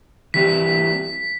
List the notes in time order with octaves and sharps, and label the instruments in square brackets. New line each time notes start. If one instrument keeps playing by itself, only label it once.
[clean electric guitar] E3 G3 C4 E4 G4 [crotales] B6